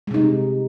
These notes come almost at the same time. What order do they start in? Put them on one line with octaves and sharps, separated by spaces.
G#3 C3 D#4